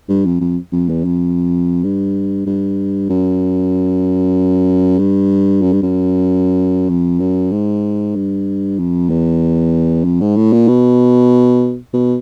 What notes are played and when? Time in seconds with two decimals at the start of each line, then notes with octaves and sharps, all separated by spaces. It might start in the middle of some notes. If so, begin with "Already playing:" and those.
0.09 G2
0.25 F2
0.41 F2
0.72 F2
0.89 E2
1.05 F2
1.84 G2
2.46 G2
3.09 F#2
4.99 G2
5.62 F#2
5.73 G2
5.83 F#2
6.89 F2
7.20 F#2
7.51 G#2
8.15 G2
8.79 F2
9.10 E2
10.05 F2
10.21 G#2
10.36 A2
10.52 A#2
10.68 B2
11.94 B2